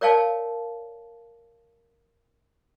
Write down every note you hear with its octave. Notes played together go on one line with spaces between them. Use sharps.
A#4 C#5 D5 F5 G5 A5